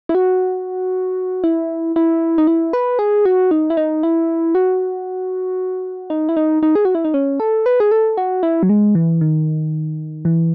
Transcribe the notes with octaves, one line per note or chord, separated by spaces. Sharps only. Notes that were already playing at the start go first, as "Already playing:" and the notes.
E4
F#4
E4
E4
D#4
E4
B4
G#4
F#4
D#4
E4
D#4
E4
F#4
D#4
E4
D#4
D#4
G#4
F#4
E4
D#4
C#4
A4
B4
G#4
A4
F#4
E4
F#3
G#3
E3
D#3
E3